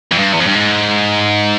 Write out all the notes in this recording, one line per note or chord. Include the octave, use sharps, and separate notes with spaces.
F2
G2
E2
F2
G2
G#2